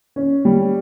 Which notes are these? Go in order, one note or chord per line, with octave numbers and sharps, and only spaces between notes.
C#4
G3